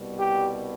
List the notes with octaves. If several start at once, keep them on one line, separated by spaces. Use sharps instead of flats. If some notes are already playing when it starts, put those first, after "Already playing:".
Already playing: C2 B2 G3
G4